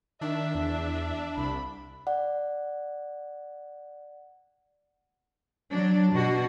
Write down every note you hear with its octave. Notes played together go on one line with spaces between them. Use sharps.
D#3 D4 E5
E2
C2 B5
D5 F#5
F#3 D4
B2 D4 F#4